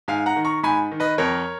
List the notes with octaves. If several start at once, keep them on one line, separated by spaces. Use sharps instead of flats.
G#2 F5 G#5
F#5 A#5
D#3
A#5 C#6
G#2 G#5 B5
D#3
B4 D#5
F2 A#4 C#5